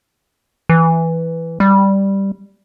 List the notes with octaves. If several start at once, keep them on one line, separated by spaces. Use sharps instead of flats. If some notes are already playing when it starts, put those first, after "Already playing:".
E3
G3